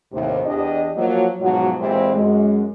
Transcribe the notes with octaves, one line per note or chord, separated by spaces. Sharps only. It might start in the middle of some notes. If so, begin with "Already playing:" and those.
D#2 A2 C3
E2 E3 D4 G4 D#5
F3 F#3 A#3
G#2 B2 F3 F#3
A#2 E3 G#3 C4 E4 G4
F#2 G#3